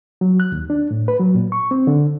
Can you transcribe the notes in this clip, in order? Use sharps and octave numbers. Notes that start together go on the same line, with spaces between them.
F#3
F#6
D#2
D4
A2
B4
F#3
A#2
C#6
C4
D3